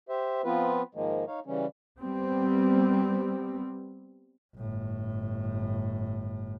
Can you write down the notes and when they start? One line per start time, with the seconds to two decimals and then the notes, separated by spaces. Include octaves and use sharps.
0.09 G4 C5 E5
0.44 F3 B3 C4 F4 B4
0.95 G#2 D#3 F3 G#3 A#3
1.27 D#4 C#5 F5
1.46 C#3 E3 G3 C#4
2.01 G3 B3 C4
4.56 G1 A2